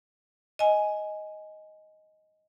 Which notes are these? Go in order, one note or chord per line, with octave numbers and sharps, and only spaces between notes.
D#5 G#5